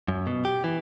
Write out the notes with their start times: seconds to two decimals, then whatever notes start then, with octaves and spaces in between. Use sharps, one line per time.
0.08 F#2
0.27 B2
0.45 G4
0.64 E3